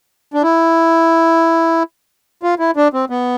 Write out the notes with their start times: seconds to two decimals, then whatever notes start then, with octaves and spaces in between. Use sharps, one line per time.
0.34 D4
0.43 E4
2.43 F4
2.59 E4
2.76 D4
2.93 C4
3.10 B3